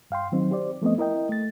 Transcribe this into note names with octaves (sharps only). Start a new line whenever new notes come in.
G2 F5 G5 C6
D#3 F#3 C4 D#4
G4 C5 D5
F3 A3 B3 C4 D#5
E4 A#4 D#5 G5
A3 A6